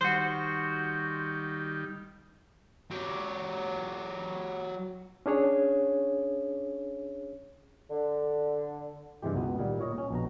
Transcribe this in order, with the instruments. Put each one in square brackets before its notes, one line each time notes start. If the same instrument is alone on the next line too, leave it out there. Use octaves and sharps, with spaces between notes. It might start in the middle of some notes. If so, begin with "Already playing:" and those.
[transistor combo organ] D#3 G3 [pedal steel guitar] F#4 C5
[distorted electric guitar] F#3 G4
[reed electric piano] C#4 D4 G#4 C#5
[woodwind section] D3
[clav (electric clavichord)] G2 C3 E3 G#3 G4
C#2 B2 B3
A#2 D#3 G3
A#2 C#5 D#5
C#4
A#1 B2 A#5